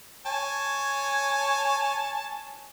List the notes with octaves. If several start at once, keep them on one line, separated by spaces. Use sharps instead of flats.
C#5 G#5 A5